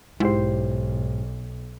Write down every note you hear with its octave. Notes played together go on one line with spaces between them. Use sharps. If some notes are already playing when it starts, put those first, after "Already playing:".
B1 G#2 E4 G4 C5